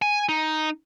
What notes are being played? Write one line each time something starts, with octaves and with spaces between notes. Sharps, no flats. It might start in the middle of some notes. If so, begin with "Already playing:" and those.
G#5
D#4